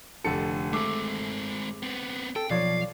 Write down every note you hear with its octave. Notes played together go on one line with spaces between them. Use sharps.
F1 D3 A4 C#7
G#3 A3 C4 D6
B3 C4
A4 G5
B1 F3 C#5 D5 F5